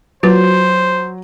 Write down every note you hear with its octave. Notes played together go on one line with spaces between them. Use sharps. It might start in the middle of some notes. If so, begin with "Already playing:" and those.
F#3 F4 F#4 B4 C5